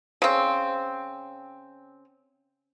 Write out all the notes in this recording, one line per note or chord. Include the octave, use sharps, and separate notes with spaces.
C#3 C4